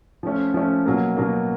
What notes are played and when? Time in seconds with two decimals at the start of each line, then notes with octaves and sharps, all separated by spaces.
0.23 F3 A3 C#4
0.54 F3 A3 C#4
0.86 B2 F#3 A#3
1.17 B2 F#3 A#3